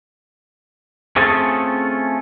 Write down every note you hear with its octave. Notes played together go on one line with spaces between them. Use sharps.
A3 C4 C#4 F4 G#4 A4